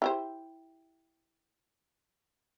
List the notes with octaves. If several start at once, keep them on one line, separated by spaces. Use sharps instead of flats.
E4 G4 C5